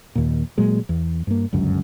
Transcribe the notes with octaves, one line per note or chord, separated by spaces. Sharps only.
D#2 A#2
A#2 F#3 G#3
E2
G2 A#3
G1 C#2 F#2